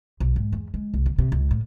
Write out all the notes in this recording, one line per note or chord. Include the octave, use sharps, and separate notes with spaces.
B1
G#2
E2
G#3
C2
D3
C3
C#2
A2